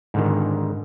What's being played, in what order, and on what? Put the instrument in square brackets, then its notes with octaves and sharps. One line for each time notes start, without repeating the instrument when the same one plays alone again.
[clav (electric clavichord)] G#2 D3 D#3